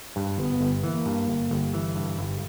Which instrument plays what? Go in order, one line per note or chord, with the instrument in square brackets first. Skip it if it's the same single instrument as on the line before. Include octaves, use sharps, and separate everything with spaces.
[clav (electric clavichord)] G2
[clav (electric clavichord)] G1 [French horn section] B3
[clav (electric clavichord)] G1
[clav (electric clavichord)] E3 [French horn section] A#3
[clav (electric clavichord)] G2
G1
G1
E3
G2
G1